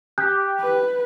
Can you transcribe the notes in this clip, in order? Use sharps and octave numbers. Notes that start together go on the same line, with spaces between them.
G4 F#6 G6
B4